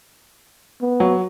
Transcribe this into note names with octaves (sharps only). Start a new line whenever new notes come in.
B3
F#3